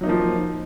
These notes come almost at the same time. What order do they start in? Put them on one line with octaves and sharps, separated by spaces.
F#3 D#4 A#3 F3